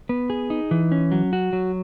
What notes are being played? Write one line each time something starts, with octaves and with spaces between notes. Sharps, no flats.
B3
G#4
D#4
E3
C#4
F#3
F#4
F#3